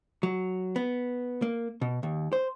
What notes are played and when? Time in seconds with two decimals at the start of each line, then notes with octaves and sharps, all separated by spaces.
0.23 F#3
0.76 B3
1.42 A#3
1.81 B2
2.03 D#2
2.33 C5